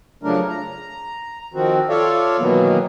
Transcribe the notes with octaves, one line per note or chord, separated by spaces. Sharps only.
C#3 F3 F#3 A3 D4 A#4
A#5
D#3 F3 C4 F#4
F4 A4 C#5 D5 E5 F5
B2 D#3 E3 F#3 A#3 B3